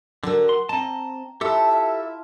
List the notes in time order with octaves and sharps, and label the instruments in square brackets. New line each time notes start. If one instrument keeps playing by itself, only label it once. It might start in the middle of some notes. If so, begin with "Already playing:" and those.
[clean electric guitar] D3 [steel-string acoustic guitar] F#3 F#4 A#4
[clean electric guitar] C6
[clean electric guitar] C4 A5 [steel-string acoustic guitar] D#5 [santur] A#5
[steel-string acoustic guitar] E4 [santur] F4 F#5 A5 [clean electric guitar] G4 A4 [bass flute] E5
[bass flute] E5 [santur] F5